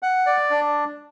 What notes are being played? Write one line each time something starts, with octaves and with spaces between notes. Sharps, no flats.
F#5
D5
D4